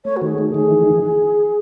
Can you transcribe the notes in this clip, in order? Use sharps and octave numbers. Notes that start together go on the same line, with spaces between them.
A3 C#5
F#4
D#3
G#4
A3
G#4
D#3
E3
E3